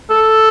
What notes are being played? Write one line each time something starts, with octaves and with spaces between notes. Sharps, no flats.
A4